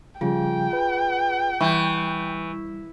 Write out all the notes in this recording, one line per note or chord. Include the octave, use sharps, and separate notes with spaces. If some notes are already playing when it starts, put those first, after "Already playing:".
C#3 F3 G3 F4 G#4 G5
B4
E3 G3 C#6 G6